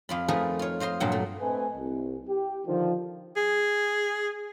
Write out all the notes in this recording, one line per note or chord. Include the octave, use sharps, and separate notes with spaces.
F2 F4 B5
F3 A3 D#4 G#4 A#4 B4
F4 C#5
F4 C5 D#5 C6
G2 A#2 F#3 F#5
A3
A3 C4 A4 B4 D#5 G#5
C2
G4
D3 D#3 F3
G#4